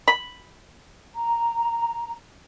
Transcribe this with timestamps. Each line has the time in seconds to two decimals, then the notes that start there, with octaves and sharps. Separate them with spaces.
0.08 B5
1.15 A#5